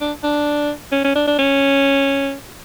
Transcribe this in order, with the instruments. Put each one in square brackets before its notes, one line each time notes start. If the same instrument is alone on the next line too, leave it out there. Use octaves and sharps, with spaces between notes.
[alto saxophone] D4
D4
C#4
C#4
D4
D4
C#4